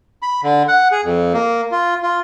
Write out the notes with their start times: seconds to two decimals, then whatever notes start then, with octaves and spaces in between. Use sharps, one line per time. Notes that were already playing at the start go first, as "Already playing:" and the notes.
0.22 B5
0.44 D3
0.68 F#5
0.92 G#4
1.04 F2
1.34 A#3
1.72 F4
2.03 F4